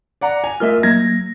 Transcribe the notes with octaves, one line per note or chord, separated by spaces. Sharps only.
D5 F#5 A#5
G#5 F7
A3 F4 A#4 D#5 E5 F6
F#3 A#3 G#6 A#6